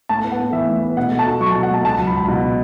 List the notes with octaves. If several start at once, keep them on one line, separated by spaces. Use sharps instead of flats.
A2 A5
B3
F#5
A2
E3 E5
A2
B3
B2 F#5
A3
A5
F#4
F#3 C#6
B2 A5
F#5
A3 A5
C#2 A5
F#3
B5
C#2
B2